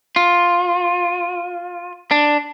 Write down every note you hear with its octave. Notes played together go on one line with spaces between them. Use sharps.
F4
D4